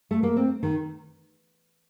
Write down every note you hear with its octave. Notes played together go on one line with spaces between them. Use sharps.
A3
A#3
C4
D#3